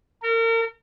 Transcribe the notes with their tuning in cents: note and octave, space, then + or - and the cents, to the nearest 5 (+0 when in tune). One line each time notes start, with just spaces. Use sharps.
A#4 -35